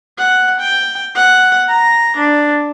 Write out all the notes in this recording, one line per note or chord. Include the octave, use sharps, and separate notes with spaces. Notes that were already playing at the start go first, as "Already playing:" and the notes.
F#5
G5
F#5
A#5
D4